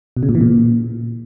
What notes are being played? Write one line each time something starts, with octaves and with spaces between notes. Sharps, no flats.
B2
C#3
A#2
E3
A#2